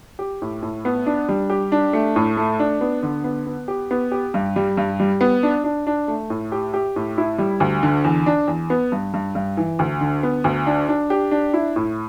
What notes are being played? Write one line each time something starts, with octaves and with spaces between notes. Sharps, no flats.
G4
A2
A2
B3
D4
G3
G4
D4
A3
A2
A3
D4
B3
D3
B3
B3
G4
B3
G4
G2
G3
G2
G3
B3
D4
D4
D4
A3
A2
G4
G4
A2
E4
G3
D2
D3
E2
D4
E2
B3
G2
G2
G2
E3
D2
D3
B3
D2
D4
D4
G4
D4
E4
A2